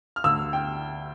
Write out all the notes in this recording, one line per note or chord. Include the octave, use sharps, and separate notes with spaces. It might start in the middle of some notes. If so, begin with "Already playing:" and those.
F6
D2 E6
G5